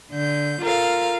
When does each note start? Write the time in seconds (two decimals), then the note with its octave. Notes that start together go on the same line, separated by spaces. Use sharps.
0.13 D3 G6
0.62 F4 A4 A#4 F5